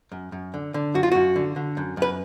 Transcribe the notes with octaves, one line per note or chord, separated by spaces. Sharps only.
F#2
F#2
D3
D3
F#2 F#4
F4
F#2 F#4
D3
D3
F#2
F#2 B4